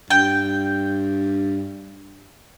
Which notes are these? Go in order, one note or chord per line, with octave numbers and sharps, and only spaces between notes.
G2 G5